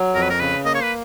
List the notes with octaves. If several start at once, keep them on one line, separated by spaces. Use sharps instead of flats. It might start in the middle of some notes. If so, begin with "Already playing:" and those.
Already playing: F#3
F2 A#4
B4
A#4
C#3 B4
A#3 D#5
C#5
B4